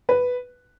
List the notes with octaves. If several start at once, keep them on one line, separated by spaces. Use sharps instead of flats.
B4